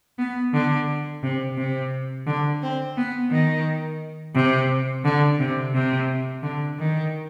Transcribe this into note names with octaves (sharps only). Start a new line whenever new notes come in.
B3
D3
C3
C3
D3
C4
B3
D#3
C3
D3
C3
C3
D3
D#3